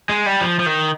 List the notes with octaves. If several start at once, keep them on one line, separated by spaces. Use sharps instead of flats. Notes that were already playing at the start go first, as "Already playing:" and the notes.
G#3
G3
F3
F3
D#3